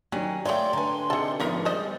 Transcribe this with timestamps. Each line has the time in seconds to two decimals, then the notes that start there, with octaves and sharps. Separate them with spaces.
0.12 D#3 F#3 G3 C#4
0.45 A3 A#3 C#5 D5 G5 C6
0.73 D3 B4 G#5 A#5
1.10 C3 D#4 G#4 A4 C#7
1.40 A1 G#2 C#3 F3 B3 A#4 E5
1.65 G3 G#3 C5 D5 D#5